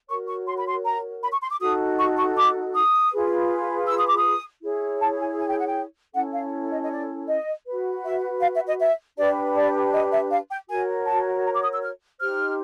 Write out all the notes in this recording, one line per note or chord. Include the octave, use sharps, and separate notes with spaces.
F#4 A#4 C#5 C#6
C#6
C6
B5
C6
A#5
B5
C#6
C6
D6
D#4 F#4 A4 D#6
C#6
C#6
D6
D#6
F4 G#4 B4
E6
D#6
D6
D#6
E4 G#4 C#5
A5
G#5
G#5
G5
F#5
G5
C#4 E4 A4 F#5
F5
D#5
D#5
D5
D#5
F#4 B4
E5
F5
E5
D#5
E5
D4 G4 B4 D5
D5
D#5
E5
F5
G5
F#4 A#4 C#5 G#5
A5
A#5
D6
D#6
E6
F6
D#4 G4 C5 F6